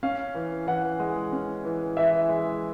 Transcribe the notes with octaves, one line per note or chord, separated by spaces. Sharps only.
C#4 F5
E3
E3 F#5
G#3
C#4
E3
E3 E5
G#3